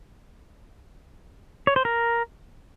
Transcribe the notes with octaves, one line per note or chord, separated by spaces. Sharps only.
C#5
C5
A#4